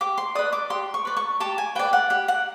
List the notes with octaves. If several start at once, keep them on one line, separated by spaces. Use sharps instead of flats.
G4 D6
C6
B4 D5 D#6
D6
G4 C6
C#6
B4 D5
C#6
G4 A5
G#5
B4 D5 G5
F#5
G4 F#5
F#5